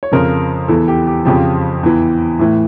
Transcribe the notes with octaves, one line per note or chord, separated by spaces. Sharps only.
C#5
F2 C#3 F3 A#4
E2 E3 A4
G4
G4
F2 C#3 F3 G4
E2 E3
A2 E3